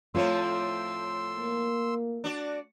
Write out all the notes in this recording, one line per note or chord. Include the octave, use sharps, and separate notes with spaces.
A2 F3 A3 C4 F4 C#5 C6 E6
A#3
D4 F#4 D5